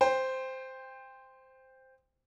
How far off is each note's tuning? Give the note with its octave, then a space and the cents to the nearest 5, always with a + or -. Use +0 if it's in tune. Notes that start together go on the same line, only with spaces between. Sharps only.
C5 -5 G5 +25